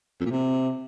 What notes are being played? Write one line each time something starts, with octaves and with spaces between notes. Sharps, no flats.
F2
A#2
C3